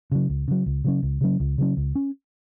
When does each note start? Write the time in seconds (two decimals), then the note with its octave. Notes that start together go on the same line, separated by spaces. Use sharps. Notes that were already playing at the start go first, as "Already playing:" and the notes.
0.12 C#3 F#3
0.29 C#2
0.48 C#3 F#3
0.66 C#2
0.84 C#3 F#3 C#4
1.03 C#2
1.21 C#3 F#3 C#4
1.40 C#2
1.58 C#3 F#3 C#4
1.77 C#2
1.95 C#4